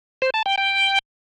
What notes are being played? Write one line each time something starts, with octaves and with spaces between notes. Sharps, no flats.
C5
A5
G5
G5